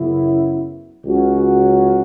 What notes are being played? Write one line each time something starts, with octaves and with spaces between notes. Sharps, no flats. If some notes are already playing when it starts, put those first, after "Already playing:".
Already playing: F#2 C#3 F#3 B3 E4
C#2 C#3 F#3 C#4 F#4